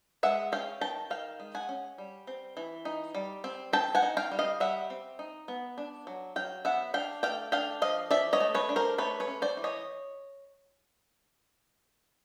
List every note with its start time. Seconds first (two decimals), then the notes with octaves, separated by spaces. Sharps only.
0.23 G#3 E5 F#5
0.52 C#4 F5 G5
0.81 D#3 G5 A5
1.10 D#3 F5 G5
1.40 G#3
1.55 F#5 G#5
1.69 C#4
1.98 G3
2.27 C4
2.57 E3
2.85 D#4
3.15 G3
3.44 C4
3.73 C4 G5 A5
3.95 F#5 G#5
4.02 D#4
4.17 F5 G5
4.32 G3
4.39 D#5 F5
4.60 G3 E5 F#5
4.90 C4
5.19 D#4
5.48 B3
5.78 D4
6.07 F#3
6.36 F#3 F5 G5
6.65 B3 E5 F#5
6.94 D4 F5 G5
7.23 A3 F5 G5
7.52 D4 F5 G5
7.82 F3 D#5 F5
8.11 F3 D5 E5
8.33 C#5 D#5
8.40 A3
8.54 B4 C#5
8.69 D4
8.76 A#4 C5
8.98 A3 B4 C#5
9.20 B4 C#5
9.27 C#4
9.42 C5 D5
9.57 E3
9.64 C#5 D#5